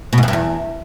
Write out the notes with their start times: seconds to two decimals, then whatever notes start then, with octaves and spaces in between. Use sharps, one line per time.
0.13 B2
0.18 G#2
0.23 F2
0.28 G2
0.33 E2